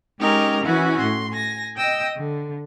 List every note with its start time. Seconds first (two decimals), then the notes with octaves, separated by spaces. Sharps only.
0.19 G#3 C#4 D#4 G4 A#4
0.63 E3 C#4 E4 F#4
0.98 A2 C6
1.32 G#5 A#6
1.77 D#5 G5 D#6 E6
2.16 D3